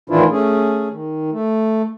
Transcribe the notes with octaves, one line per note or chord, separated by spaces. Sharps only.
A2 D#3 E3 D4 E4 F4
A3 C#4 G#4
D#3
A3